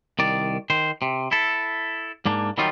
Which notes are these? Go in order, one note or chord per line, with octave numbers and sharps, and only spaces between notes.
C2 D#3 D5
D#3 C5
C3
E4 A4
G#2 A#3 D4
D#3 F#3 G3 D#4 F4